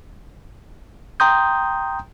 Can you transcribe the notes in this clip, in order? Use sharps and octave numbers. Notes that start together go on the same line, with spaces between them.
G5 A#5 C6 D#6 G6